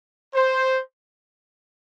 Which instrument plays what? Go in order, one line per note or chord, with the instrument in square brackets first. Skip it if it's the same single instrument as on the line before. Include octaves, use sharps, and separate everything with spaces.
[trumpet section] C5